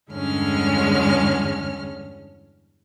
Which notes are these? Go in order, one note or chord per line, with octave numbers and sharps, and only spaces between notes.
E2 G2 D3 G#3 C#4 F6